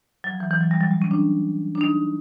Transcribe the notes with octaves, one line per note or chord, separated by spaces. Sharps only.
F#3
F3
E3
E3
F#3
G3
F#3
G3
C#4
D4
D4
D#4